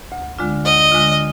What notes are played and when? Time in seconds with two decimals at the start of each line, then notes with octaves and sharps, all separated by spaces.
0.12 D2
0.39 D3 G#3 D4 F4
0.65 D2 D#5
0.92 D3 G#3 D4 F4